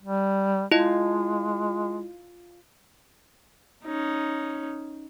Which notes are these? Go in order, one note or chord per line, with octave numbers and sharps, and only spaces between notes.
G3
G#3 E4 F4 D#5
C#4 D#4